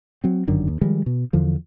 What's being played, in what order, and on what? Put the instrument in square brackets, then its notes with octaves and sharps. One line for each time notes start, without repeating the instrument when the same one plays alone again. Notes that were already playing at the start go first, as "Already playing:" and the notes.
[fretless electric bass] F#3 C4
G1 F#2 D3 D#3
D#2
D#3 F3 G3 G#3
B2
E2 D3 F3